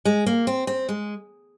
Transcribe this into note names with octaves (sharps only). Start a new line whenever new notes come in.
G#3
A#3
C4
C4
G#3